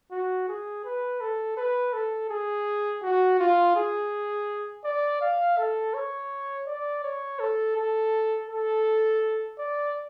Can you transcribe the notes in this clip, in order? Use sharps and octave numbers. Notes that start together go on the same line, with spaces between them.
F#4
G#4
B4
A4
B4
A4
G#4
F#4
F4
G#4
D5
F5
A4
C#5
D5
C#5
A4
A4
A4
D5